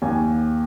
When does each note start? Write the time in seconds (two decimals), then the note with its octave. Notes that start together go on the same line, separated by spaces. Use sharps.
0.02 D#2 G#5